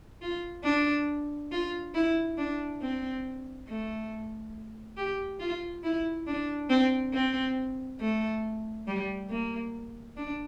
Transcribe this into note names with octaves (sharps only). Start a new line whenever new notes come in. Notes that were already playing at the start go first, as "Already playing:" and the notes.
F4
D4
F4
E4
D4
C4
A3
G4
F4
E4
D4
C4
C4
A3
G3
A#3
D4